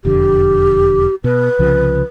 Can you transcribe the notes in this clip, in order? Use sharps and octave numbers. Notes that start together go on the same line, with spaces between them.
E1 F2 D3 G4
B2 B4
C2 C#3 F3